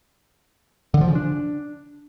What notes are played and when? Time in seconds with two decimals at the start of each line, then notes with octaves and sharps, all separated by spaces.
0.94 D3
1.01 F3
1.08 C#3
1.15 D4